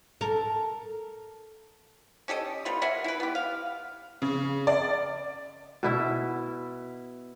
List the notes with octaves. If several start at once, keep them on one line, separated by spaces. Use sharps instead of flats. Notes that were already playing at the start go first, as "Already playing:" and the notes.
A4 A#4
C#4 G4 A4 D#5
G3 B3 F4 B5
A#4 E5 F#5 G#5
E4 B4
B3 G4
F5
C#3
D5
B2 E4 E5